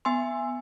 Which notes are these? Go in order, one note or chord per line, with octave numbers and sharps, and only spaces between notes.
B3 G#5 C6